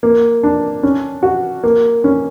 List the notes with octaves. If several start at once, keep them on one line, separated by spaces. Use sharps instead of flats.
A#3
D4
C#4
F#4
A#3
C#4